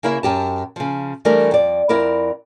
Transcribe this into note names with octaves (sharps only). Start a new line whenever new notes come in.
C#3 A#3 E4 A#4 E5
F#2 G4 A5
C#3 F3
E3 G3 A3 D4 A#4
F2 D5
F2 E4 A#4 D5